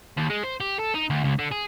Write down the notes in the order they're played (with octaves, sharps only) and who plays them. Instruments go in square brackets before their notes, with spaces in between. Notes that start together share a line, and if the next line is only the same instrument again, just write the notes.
[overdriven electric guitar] D#2
G#3
C5
G4
A4
D#4
D2
C#2
D3
G#4